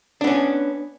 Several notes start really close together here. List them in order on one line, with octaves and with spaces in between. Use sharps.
D4 B3 C#4